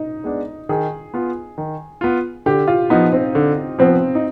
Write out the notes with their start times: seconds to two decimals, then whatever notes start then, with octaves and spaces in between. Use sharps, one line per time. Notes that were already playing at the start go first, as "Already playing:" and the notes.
Already playing: D#4
0.24 G#3 B3 D4
0.69 D#3 G#4
1.14 B3 F4
1.58 D#3
2.01 B3 F4
2.46 D3 G4
2.68 F4
2.90 F3 B3 D#4
3.12 C4
3.35 D3
3.79 F3 B3 C4
4.15 D#4